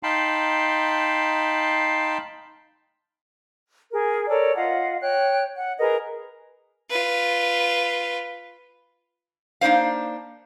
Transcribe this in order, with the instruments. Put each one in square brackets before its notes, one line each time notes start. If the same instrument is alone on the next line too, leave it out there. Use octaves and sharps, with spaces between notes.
[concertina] D#4 F5 G5 A5 B5 C6
[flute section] G#4 A#4
A4 A#4 C#5 D5
F4 D#5 F5 F#5
C#5 G5 F#6
F#5
G#4 A#4 B4 D#5
[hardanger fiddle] F4 B4
[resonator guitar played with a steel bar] A#3 D4 D#4 C5 F5